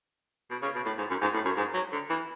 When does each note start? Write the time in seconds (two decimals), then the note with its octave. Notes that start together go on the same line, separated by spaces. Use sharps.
0.51 B2
0.62 C#3
0.75 B2
0.86 A2
0.98 G#2
1.10 F#2
1.21 G#2
1.34 A2
1.45 F#2
1.57 G#2
1.74 F#3
1.92 D3
2.10 E3